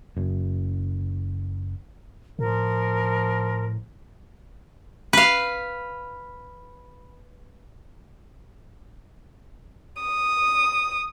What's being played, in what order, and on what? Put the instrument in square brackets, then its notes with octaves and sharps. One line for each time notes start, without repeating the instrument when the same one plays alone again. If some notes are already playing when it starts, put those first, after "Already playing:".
[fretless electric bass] F#1 F#2
[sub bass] A2 [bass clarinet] F3 [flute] A#4
[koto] B4 F5
[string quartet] D#6